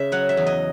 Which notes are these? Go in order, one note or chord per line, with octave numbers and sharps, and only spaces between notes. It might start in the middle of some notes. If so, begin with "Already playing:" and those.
Already playing: C#3 G#4 E5
F#3 F#5
E5
E2
D#5